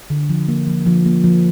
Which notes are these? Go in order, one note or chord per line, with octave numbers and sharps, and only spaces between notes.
D3
F3
A#3
F3
F3
A#3
F3